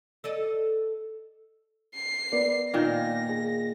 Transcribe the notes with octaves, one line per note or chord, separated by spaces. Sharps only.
A4 D5 D#5
C7
B3 A#4 D5
A#2 D#3 A#3 A#6
G#4